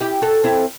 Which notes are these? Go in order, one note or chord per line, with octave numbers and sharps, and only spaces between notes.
E4 G4
F#4 A4
C4 E4